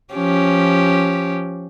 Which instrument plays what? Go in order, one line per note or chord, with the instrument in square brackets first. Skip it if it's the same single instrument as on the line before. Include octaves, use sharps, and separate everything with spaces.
[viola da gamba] F3 C#4 G4